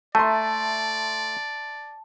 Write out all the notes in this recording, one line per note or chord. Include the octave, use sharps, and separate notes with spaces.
A3 D5 E5 A5 A#5 C6